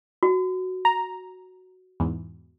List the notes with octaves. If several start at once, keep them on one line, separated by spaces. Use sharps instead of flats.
F#4
A#5
E2 G#2